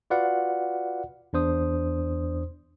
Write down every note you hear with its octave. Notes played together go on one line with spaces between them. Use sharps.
F4 F#4 B4 D5 F5 F#5
E2 D4 C5 D#6